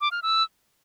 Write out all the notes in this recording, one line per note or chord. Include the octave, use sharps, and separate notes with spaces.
D6
F6
E6